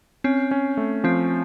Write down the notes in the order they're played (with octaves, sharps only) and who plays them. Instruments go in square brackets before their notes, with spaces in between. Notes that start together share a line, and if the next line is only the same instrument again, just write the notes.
[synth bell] C4 [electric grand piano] C#4
[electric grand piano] C#4
A3
[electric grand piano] F3 [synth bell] C4